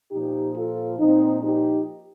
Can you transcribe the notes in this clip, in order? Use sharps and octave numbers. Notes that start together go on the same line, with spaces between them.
A#2 F3 D#4 G4
F4 A4
A#2 F3 C4 D#4
D#4 G4